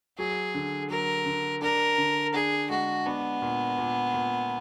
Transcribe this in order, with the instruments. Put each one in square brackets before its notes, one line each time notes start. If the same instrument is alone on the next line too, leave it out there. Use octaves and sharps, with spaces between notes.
[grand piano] F#3 [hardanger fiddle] G#4
[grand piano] D3
[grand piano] F#3 [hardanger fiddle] A#4
[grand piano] D3
[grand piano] D4 [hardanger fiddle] A#4
[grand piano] D3
[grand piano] D4 [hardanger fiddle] G#4
[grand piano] G#3 [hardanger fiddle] F#4
[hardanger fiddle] B3 [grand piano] D4
[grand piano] A#2
A#2
A#2